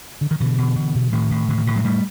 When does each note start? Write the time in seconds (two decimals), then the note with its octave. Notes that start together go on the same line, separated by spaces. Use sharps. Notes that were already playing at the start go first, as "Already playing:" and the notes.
0.21 D3
0.31 D#3
0.40 B2 D3 E3
0.58 B2
0.76 B2
0.95 B2
1.12 A2 D#3
1.31 A2
1.49 A2 D3
1.58 D#3
1.67 A2 D3
1.76 F#3 G#3
1.84 A2 G3 A3